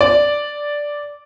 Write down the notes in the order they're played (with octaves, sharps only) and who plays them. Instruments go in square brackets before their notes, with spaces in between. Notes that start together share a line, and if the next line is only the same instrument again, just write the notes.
[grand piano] D5